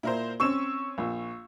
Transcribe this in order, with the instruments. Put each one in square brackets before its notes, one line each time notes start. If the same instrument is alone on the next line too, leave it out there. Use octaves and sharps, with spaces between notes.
[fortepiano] A#2 [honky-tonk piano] E4 A#4 C5
[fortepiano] C4 C#4 [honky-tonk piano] C#6 E6 E7
[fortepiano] A#1